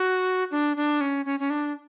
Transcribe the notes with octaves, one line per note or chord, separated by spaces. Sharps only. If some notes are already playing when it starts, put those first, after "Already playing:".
Already playing: F#4
D4
D4
C#4
C#4
C#4
D4